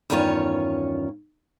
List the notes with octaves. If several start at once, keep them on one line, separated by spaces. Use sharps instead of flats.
E2 G2 D#3 C#4 F4 C#5